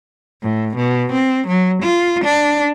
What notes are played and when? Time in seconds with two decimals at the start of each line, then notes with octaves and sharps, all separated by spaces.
0.42 A2
0.76 B2
1.12 C4
1.47 F#3
1.82 F4
2.24 D4